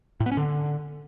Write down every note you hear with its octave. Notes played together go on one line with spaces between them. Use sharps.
A2
B3
C#4
D3